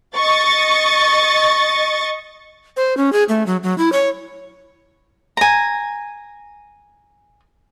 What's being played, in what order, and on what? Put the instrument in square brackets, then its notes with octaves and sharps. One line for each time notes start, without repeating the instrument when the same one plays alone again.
[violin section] D#5 C#6 A6
[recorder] C5
C#4
G#4
A3
F#3
F#3
E4
C#5
[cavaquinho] G#5 A#5